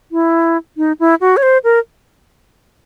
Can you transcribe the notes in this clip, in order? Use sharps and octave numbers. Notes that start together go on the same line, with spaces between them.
E4
D#4
E4
F#4
C#5
C5
A#4